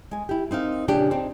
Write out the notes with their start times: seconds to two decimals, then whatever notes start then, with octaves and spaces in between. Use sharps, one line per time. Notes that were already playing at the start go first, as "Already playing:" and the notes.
0.11 G#3 G#5
0.29 E4 G4
0.51 C4 D#4 A#4 F5
0.88 A#2 C#3 F3 D4 G4
1.11 C4 D4 D#4